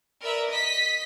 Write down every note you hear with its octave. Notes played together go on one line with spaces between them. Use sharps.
A#4 B4 D5 E5
D#5 B6